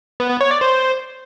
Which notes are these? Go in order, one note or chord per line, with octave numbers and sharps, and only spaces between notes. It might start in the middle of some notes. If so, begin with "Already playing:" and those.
B3
B3
C#5
D5
C5